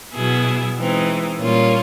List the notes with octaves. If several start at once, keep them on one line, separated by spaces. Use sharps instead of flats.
B2 F#3 B3 E4 G#4
E3 G#3 C4 D#4
A#2 G3 A#3 C#4 F4